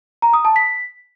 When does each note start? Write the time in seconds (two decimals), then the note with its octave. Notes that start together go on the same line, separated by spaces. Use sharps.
0.22 A#5
0.34 D#6
0.45 A5
0.56 B6